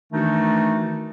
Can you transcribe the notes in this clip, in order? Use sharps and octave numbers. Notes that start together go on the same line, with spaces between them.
D#3 E3 A3 D4 D#4 F#4